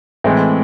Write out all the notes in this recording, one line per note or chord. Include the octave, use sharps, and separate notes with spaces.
A2 E3 G#3 C4